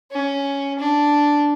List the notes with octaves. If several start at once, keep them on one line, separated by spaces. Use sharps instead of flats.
C#4
D4